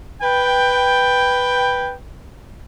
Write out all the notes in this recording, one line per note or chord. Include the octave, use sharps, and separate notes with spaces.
B4 G5